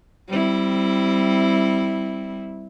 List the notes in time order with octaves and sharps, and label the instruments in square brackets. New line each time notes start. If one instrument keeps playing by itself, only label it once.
[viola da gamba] G3 C4 E4